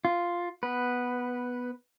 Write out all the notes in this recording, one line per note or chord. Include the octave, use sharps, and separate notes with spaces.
F4
B3 B4